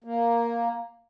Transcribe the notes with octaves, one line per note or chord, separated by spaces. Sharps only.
A#3